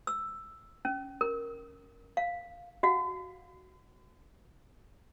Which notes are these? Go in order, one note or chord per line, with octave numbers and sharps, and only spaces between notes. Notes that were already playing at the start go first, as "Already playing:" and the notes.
E6
C#4
A#4
F5
F#4 F5 F#5